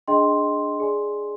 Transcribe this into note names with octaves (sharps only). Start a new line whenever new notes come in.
D4 G#4 D#5 G5 C6
G#4 D5 G#5 C6